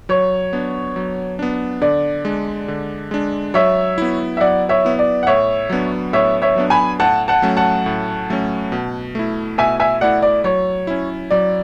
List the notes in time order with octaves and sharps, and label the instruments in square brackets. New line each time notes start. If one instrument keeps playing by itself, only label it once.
[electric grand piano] F#3 [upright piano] C#5
[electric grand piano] B3 D4
F#3
B3 D4
[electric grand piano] D3 [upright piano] D5
[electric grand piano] G#3 D4
D3
G#3 D4
[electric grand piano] F#3 [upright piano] C#5 E5
[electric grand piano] B3 E4
[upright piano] E5
[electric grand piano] F#3 [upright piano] D5 F#5
[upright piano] C#5 E5
[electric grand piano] B3 E4
[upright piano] D5
F#5
[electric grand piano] A2 [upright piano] C#5 E5
[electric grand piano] F#3 B3 D4
[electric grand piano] A2 [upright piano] C#5 E5
[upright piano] C#5 E5
[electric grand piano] F#3 B3 D4
[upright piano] G#5 B5
[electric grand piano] A2 [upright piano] F#5 A5
[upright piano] F#5 A5
[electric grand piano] F#3 A3 C#4
[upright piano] F#5 A5
[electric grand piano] A2
F#3 A3 C#4
B2
A3 E4
[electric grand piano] B2 [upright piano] E5 G#5
[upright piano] E5 G#5
[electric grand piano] A3 E4 [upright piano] D5 F#5
[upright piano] D5
[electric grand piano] F#3 [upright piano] C#5
[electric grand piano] C#4 E4
[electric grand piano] F#3 [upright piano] D5